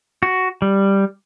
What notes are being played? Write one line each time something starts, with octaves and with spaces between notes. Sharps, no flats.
F#4
G3